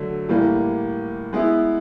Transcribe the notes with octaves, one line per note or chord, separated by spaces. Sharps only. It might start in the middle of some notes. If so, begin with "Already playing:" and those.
Already playing: D3 F#3 A3
A2 E3 G3 A#3
G#3 B3 E4